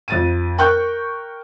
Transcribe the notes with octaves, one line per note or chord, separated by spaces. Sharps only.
F2 A6 D#7
A#4 G5 C#6 F#6 G6